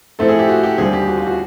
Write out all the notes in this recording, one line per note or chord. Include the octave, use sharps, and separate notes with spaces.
A2 F3 A3 C4 A4
G#4
G4
F#4
G4
D#2 D3 G3 C4 G#4
G4
F#4
F4
F#4